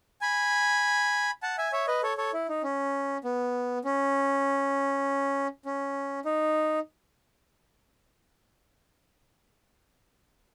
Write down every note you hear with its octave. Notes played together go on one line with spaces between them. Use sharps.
G#5 B5
F#5 A5
E5 G#5
C#5 E5
B4 D#5
A4 C#5
A4 C#5
E4
D#4
C#4
B3
C#4
C#4
D#4